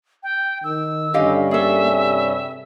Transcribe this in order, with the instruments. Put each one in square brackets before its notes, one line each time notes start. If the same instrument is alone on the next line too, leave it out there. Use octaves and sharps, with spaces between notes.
[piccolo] G5
[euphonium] D#3 [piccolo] E6
[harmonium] G2 G3 C#4 [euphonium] D3 [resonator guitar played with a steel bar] G4 D#5 F5
[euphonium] A#3 [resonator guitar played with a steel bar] G#4 A4 [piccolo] E5
[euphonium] C3